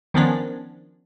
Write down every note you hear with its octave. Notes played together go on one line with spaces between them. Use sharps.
D#3 F3 B3 C#4 D4